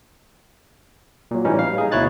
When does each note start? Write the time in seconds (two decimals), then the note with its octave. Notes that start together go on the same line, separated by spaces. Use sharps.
1.31 A#2 F#3
1.45 A2 E3 G3 C#4 D#4
1.59 F5
1.78 D#4 G#4
1.92 D2 B2 E4 C#5 F#6 A6